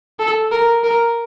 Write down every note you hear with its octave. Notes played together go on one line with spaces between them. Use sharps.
A4
A#4
A#4